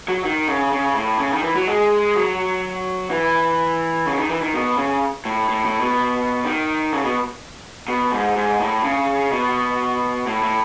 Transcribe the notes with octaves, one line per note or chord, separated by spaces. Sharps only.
F#3
D#3
C#3
C#3
A2
C#3
D#3
E3
F#3
G#3
F#3
E3
C#3
D#3
E3
D#3
B2
C#3
A2
A2
A2
B2
D#3
C#3
B2
B2
G#2
G#2
A2
C#3
B2
A2
A2